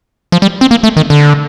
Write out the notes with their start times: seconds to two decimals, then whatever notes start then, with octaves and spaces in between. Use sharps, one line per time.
0.32 F3
0.42 G3
0.61 C4
0.71 A#3
0.83 A3
0.97 D#3
1.10 D3